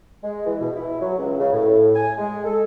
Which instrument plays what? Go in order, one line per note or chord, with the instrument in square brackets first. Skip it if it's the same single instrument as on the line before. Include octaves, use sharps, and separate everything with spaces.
[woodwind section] G#3
E3
B2
E4
F#3
C#2
C#3
A2
G#5
G#3
A4